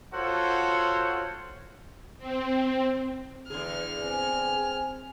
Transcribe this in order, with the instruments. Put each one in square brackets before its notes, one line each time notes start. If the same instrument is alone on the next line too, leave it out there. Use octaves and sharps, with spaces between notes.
[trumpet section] F4 F#4 A4 C5 C#5 F#5
[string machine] C4
[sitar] E2 D3 G#4 [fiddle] F6
[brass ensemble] C4 G#5